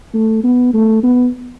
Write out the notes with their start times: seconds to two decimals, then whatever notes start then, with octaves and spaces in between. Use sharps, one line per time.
0.14 A3
0.44 B3
0.74 A3
1.03 B3